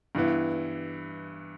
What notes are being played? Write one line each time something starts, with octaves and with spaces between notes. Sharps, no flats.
G2 E3 B3 E4